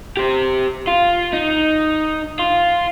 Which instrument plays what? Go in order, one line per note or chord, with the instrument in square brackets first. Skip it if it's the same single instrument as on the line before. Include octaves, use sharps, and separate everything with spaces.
[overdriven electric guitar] G4 C5
F4
D#4
F4